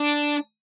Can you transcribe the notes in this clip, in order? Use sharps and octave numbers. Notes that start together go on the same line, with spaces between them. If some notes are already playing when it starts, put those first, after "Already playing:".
Already playing: D4